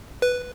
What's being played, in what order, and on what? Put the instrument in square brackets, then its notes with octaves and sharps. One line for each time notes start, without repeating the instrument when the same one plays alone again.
[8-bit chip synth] B4